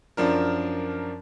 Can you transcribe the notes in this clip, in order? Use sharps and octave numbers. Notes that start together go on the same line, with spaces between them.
F#2 F3 D4 A#4